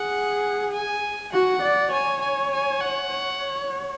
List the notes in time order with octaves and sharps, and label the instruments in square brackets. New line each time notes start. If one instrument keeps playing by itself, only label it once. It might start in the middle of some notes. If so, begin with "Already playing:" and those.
Already playing: [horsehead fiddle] G#4 [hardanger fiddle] F#5
[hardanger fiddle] G#5
[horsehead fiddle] F#4 [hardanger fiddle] F#5
[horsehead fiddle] D5
[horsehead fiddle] C#5 [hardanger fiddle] G#5
[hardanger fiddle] G#5
G#5
F#5
[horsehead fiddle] C#5